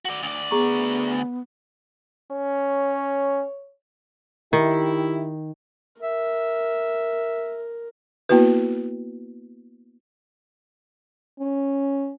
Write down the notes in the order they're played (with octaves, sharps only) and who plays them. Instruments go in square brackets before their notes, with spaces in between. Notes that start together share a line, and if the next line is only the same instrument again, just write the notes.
[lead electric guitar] F#4 D5
D2 D5
[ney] B3 [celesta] G#4 A#5 C#6
[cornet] C#4 [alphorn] C#5
[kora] D#3 [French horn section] E4 G4
[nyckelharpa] A#4 [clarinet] E5
[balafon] A#3 B3 E4 F#4 B4
[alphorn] C#4